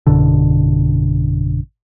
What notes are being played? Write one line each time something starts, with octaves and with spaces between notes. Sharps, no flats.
A1 F#2 B2 D3